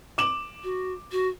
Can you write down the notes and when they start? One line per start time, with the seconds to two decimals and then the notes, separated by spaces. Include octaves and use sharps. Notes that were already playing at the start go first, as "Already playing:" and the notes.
0.18 D6 E7 F#7
0.64 F#4
1.12 F#4